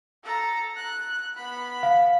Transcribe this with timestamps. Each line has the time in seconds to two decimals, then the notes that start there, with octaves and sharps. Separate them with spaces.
0.24 A4 A#5
0.76 F#6
1.37 B3 B5
1.83 F5